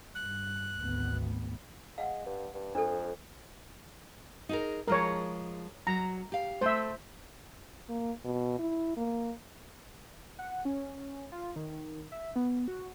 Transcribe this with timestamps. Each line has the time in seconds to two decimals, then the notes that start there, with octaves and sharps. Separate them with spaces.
0.15 G2 F#6
0.81 G#1 D2 B3
1.98 G#3 F5 F#5
2.26 G2
2.54 G2
2.75 F2 D4 A4
4.49 D#4 G#4 A#4
4.88 F3 G#3 A#4 C#5
5.87 F#3 A#5
6.32 G4 F5
6.61 A3 C5 E5
7.89 A#3
8.25 B2
8.59 E4
8.97 A#3
10.39 F#5
10.65 C#4
11.32 F4
11.56 D#3
12.12 E5
12.36 B3
12.68 F#4